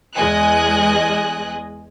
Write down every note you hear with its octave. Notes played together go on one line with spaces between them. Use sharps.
E2 G#3 D#5 G#5 F#6